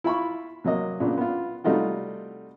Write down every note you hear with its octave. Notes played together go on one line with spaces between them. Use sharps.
E4 F4 B5 C#6
C3 F#3 A#3 D#5
A#2 C#3 B3 D4
B3 F4
C3 G3 A3 D#4 F4 F#4